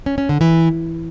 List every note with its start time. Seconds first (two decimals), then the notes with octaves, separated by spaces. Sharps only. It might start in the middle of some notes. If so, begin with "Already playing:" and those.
0.06 C#4
0.18 C#4
0.29 D3
0.41 E3